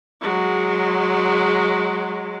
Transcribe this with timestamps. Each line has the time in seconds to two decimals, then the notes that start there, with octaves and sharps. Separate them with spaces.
0.21 F#3 G#3